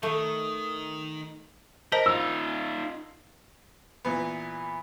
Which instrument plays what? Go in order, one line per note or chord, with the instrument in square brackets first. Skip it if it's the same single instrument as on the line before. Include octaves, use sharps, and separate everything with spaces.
[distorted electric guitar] D#3 [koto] A3
[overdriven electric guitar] A#4 [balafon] C5 D#5 A5
[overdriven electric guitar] D#4 F4 [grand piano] E6
[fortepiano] A#2 E3 B3